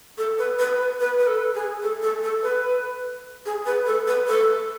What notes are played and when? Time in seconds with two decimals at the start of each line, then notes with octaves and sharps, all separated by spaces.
0.18 A4
0.39 B4
0.59 B4
1.00 B4
1.19 B4
1.27 A4
1.55 G#4
1.82 A4
2.02 A4
2.23 A4
2.43 B4
3.46 G#4
3.66 B4
3.86 A4
4.07 B4
4.27 A4